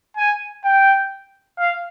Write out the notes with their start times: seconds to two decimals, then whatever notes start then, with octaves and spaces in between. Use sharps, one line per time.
0.17 G#5
0.64 G5
1.58 F5